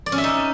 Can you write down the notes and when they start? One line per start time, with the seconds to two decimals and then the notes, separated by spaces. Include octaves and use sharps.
0.06 D5
0.12 C#4
0.18 E5
0.24 D#4